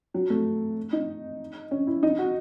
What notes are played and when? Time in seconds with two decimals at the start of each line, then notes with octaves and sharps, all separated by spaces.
0.14 F#3
0.30 A3
0.93 D#4
1.71 C#4
1.87 E4
2.03 D#4
2.19 F#4